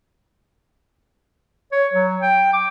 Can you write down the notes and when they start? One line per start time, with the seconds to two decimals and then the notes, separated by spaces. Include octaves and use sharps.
1.72 C#5
1.93 F#3
2.21 G5
2.53 D6